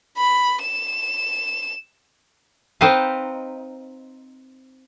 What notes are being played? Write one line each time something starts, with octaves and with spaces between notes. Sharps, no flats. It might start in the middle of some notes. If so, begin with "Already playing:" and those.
B5
E7
C4 D#4 B4 C5 D#5 F5